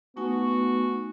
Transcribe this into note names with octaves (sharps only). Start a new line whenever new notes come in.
A3 B3 D#4 F#4 G#5